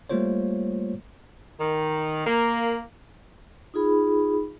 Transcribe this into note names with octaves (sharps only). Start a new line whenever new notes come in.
G3 A3 A#3 F4 C5 C#5
D#3
A#3
D#4 F4 G#4 B5